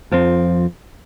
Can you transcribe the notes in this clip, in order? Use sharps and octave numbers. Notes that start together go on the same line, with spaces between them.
F2 F3 C4